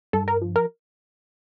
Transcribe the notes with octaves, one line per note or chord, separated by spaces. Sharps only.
G2 A4
A#4
F3
A#4